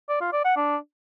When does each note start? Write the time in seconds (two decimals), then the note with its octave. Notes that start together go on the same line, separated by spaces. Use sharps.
0.09 D5
0.21 F4
0.33 D5
0.45 F#5
0.56 D4